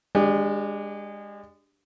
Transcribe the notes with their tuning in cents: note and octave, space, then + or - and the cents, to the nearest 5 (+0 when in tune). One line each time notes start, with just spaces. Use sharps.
G#3 -25 D4 +0 G4 +0